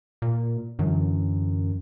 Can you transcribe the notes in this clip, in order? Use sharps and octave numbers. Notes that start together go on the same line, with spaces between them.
A#2
F#2 D3 E3 F#3